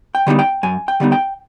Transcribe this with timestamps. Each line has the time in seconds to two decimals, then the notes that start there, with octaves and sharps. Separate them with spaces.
0.15 G5
0.27 D3 G3 B3 D#4
0.39 G5
0.63 F#2 G#5
0.88 G5
1.00 D3 G3 B3 D#4
1.12 G5